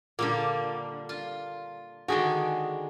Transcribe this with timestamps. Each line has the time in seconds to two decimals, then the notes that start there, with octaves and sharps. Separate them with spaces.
0.19 A#2 D3 G3 A#3
1.09 F4
2.08 D3 D#3 G#3 F#4 G#4